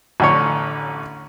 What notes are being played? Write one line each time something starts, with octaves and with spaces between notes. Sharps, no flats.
A1 D3 C#5